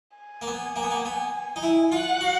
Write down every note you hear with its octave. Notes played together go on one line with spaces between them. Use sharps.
G#5
A#3
B3
A#3
B3
A#3
B3
D#4
E4
F4 F#5
F#4